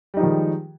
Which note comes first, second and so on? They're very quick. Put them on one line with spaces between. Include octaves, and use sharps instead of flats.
G3 D#4 F3 D#3 G#3